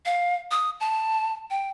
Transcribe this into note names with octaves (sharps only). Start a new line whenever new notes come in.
F5
D#6
A5
G5